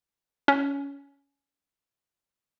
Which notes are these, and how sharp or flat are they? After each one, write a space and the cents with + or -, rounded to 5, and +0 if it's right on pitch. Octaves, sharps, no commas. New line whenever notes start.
C#4 +15